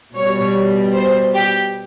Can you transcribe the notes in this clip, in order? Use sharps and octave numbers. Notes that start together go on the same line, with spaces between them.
B2 G3 C#5
C5
G4